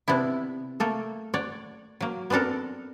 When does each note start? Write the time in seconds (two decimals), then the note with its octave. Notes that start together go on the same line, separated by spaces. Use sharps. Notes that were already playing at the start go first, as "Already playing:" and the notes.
0.08 C3 B3 D4 E4
0.80 A3 A#3 A4
1.34 C#5 D5 F#5
2.00 F#3 A#3
2.30 B3 C4 D4 A4 A#4